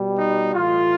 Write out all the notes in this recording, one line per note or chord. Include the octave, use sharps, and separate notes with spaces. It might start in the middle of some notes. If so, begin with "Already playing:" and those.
Already playing: B2 G3
D#4
A2 E3 A3 F4